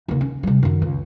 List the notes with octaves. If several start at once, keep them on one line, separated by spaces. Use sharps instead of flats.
D#2 C#3
C#4
C3 G3
F#2 D#3
C#2